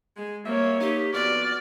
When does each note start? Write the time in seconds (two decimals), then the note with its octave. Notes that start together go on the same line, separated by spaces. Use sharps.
0.17 G#3
0.45 G3 A#3 C4 C#5 E5
0.81 D#4 G4
1.14 F2 B3 F#4 D5 F6